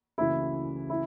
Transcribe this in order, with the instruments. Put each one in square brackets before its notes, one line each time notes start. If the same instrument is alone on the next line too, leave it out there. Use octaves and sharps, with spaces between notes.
[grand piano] C#2 C#3 E3 A3 F#4 [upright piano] E4
[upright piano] E4